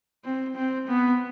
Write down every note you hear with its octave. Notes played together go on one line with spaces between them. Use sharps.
C4
C4
B3